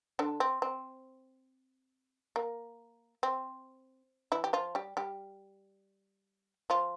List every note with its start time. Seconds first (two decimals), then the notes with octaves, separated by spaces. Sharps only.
0.19 D3 D4
0.40 C4
0.62 C4
2.36 A#3
3.23 C4
4.32 E3 E4
4.44 G4
4.53 F3 F4
4.75 G3 G4
4.97 G3 G4
6.70 F3 F4